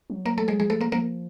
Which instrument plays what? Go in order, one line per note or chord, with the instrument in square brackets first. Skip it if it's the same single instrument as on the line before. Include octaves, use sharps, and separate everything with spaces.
[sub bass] F#3
[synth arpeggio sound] A#3 A#4
A3 A4
G#3 G#4
[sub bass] F3 [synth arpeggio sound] G#3 G#4
[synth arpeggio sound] A3 A4
A#3 A#4
[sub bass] F3 [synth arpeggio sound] A#3 A#4